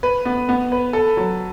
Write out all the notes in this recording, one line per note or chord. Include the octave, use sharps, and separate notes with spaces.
B4
B3
B3
B4
A4
F#3